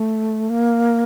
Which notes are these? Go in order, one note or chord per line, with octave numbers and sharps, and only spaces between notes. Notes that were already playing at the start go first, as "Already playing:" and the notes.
Already playing: A3
A#3